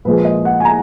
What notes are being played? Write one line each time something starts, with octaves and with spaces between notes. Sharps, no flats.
A#2 F3 G#3 B4
D#5
F#5
G#5
A#5